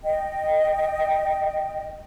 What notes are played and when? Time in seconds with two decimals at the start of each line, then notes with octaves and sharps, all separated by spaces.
0.04 D#5 G5